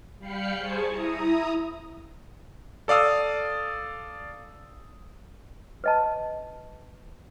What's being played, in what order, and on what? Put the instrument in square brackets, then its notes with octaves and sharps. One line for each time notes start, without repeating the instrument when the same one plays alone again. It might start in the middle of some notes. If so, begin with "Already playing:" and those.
[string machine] G3 F5 G5 B5 C7 C#7
G#4 C5 G#5 A5 C#6
E4 A#5 D#6
[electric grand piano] A4 D5 F5 D#6 E6
[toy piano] B4 D#5 A5